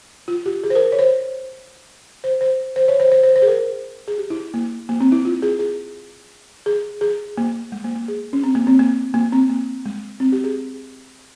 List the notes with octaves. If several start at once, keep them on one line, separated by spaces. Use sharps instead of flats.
F4
G4
G#4
C5
A#4
C#5
C5
C5
C5
C5
C#5
C5
C5
C5
C5
G#4
A#4
G#4
G4
E4
A#3
A#3
C4
E4
F4
G#4
G#4
G#4
G#4
A#3
G#3
A#3
A#3
G#4
C#4
C4
A#3
C4
A#3
A#3
C4
A#3
G#3
C4
G4
G#4